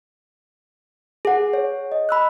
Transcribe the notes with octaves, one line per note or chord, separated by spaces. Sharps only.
G#4 F#5
C#5
D#5
B5 E6 F#6